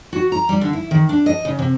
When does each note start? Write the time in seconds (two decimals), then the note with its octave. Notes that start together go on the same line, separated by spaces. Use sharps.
0.13 F#4
0.32 A#5
0.49 G3
0.61 D3
0.73 E4
0.91 D#3
1.09 D4
1.26 D#5
1.45 C#3
1.59 C3